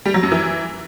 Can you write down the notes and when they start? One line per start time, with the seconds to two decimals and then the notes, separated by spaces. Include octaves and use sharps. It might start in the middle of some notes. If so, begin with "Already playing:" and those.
0.05 G3
0.14 F#3
0.23 F#2
0.32 E3